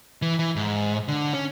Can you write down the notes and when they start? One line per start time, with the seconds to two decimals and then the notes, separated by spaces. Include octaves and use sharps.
0.22 E3
0.39 E3
0.56 G#2
1.08 D3
1.33 C#4